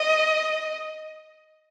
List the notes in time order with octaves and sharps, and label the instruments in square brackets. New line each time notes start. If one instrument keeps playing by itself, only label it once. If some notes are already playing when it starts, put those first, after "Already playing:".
Already playing: [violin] D#5